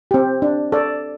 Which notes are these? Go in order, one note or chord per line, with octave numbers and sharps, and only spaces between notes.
C4 G4
D4
A4 D5